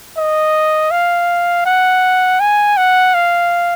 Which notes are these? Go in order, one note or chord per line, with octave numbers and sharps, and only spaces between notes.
D#5
F5
F#5
G#5
F#5
F5